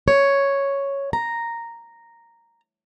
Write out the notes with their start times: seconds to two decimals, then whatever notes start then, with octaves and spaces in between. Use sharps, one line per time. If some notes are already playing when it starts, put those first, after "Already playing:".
0.08 C#5
1.13 A#5